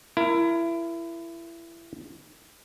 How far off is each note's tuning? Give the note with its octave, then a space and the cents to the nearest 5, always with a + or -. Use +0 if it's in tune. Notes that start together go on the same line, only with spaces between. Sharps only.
E4 +25 A#4 +0